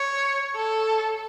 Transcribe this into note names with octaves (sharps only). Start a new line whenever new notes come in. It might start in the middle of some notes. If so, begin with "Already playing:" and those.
Already playing: C#5
A4